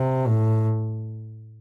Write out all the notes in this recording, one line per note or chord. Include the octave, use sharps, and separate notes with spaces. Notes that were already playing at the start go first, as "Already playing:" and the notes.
Already playing: C3
A2